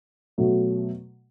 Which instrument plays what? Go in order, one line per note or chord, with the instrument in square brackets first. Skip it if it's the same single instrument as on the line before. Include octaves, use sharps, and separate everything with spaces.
[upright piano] B2 F#3 A3